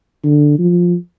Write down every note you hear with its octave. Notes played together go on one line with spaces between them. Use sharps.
D3
F3